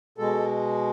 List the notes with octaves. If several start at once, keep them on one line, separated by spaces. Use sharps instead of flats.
B2 G#3 A4